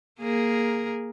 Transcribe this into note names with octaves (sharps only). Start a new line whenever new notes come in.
A#3 G#4 A#4